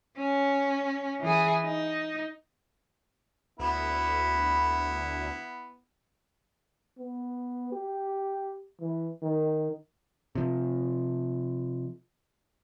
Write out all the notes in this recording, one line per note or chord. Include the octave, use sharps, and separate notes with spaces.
C#4
E3 G#4
D#4
D2 B3 E4
B3
G4
E3
D#3
C3 F3